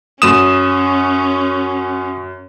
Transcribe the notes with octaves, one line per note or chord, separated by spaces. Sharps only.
F#2 C#4 D#6 E7